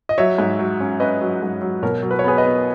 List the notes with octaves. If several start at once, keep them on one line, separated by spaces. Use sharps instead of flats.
D#5
F#3 C#5 E5
G#2
F#3
C#4
C#4 B4 D#5
F#3
G#2
F#3
B2 A#4 C#5
F#3
B4
C#5
B3 G#4 B4
B4 D#5
B3